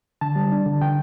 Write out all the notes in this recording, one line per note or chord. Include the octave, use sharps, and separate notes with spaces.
D3 A5
G3
D4
D3
D3 G5